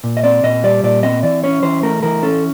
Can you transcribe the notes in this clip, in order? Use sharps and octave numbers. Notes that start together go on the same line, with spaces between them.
A#2
D#5
C4 D5
A#2 D#5
G3 D5
A#2 D5
C4 D#5
E3 D5
C#4 C#5
E3 C5
A3 A#4
E3 A#4
C#4 A4